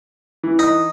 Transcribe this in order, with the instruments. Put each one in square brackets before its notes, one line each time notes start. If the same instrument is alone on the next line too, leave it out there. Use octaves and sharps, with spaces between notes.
[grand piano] E3
[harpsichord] D#4